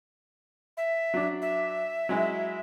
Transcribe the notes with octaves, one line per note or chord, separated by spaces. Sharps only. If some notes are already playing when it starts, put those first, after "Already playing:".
E5
F#3 D4
E5
F#3 G#3 E4